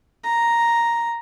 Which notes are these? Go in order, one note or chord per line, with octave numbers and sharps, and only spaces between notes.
A#5